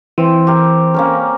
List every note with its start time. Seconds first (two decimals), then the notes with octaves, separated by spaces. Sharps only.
0.18 E3 C4
0.47 G4 A#4
0.94 A#3 C#4 A#4